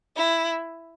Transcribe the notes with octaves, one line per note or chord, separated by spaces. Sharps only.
E4